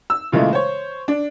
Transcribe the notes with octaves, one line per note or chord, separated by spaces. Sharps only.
E6
A#2 C#3 E3 G#3 A3
C5 C#5
D4